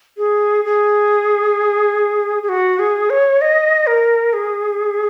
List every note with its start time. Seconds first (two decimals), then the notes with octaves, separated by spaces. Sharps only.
0.17 G#4
0.65 G#4
2.43 G#4
2.49 F#4
2.79 G#4
3.10 C#5
3.41 D#5
3.87 A#4
4.33 G#4